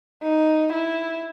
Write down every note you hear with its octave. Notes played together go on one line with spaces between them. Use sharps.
D#4
E4